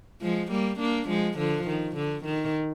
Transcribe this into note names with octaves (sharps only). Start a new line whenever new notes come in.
F3 G#3
G3 A#3
A#3 D4
F3 G#3
D3 F3
D#3
D3
D#3